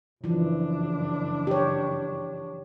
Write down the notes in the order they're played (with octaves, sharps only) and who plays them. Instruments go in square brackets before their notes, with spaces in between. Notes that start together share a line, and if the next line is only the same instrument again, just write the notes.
[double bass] F#1 D4 [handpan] E3 F3
[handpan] G4 C#5